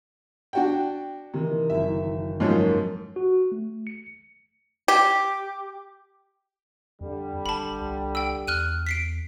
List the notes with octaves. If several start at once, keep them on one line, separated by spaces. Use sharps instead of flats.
D4 F#4 G5
C3 D#3 E3
F#1 F#2 E5
G#2 F3 F#3 A#3 C#4 D#4
F#4
A3
C#7
G4
F2 D3 G3
G#1 A5 B5
C2
G5 E6
E2 F6 F#6 D#7
B6 C7 D7